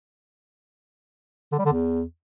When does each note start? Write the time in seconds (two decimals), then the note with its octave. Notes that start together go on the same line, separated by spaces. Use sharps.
1.52 D3
1.59 G3
1.65 D3
1.72 E2